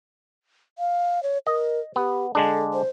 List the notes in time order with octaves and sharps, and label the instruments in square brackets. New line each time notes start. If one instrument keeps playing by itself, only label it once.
[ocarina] F5
C#5
[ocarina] A#4 [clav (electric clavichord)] D#5
[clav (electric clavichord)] B3 [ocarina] G4
[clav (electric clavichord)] D3 G#3 D4 [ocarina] A4
[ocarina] C5